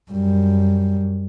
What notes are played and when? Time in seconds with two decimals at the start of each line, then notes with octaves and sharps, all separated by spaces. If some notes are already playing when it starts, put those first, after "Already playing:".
0.12 F#2 G3